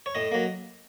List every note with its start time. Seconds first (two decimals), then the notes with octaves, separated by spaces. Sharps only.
0.06 C#5
0.15 A2 D#5
0.31 F#3 A#3